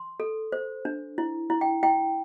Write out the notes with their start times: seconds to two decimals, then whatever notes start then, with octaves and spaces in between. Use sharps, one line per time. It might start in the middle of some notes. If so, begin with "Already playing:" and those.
Already playing: C6
0.20 A4
0.52 C5
0.85 D4
1.18 E4
1.50 E4
1.61 G5
1.83 E4 G5